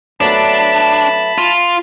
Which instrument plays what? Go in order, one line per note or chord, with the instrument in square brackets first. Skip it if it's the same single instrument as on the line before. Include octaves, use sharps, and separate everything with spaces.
[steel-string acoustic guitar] F#3 A3 B3 [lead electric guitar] D4 [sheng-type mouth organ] A5 B5
[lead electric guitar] F4